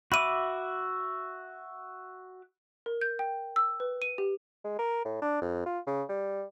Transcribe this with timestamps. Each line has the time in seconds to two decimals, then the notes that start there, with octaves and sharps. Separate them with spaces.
0.12 F#4 E5 B5 D6 D#7
2.86 A#4
3.01 G6
3.19 G5
3.56 E6
3.80 B4
4.02 D#7
4.18 G4
4.64 G#3
4.79 A#4
5.05 A2
5.22 D4
5.42 F2
5.66 F4
5.87 C#3
6.09 G3